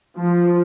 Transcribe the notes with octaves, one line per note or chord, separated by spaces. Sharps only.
F3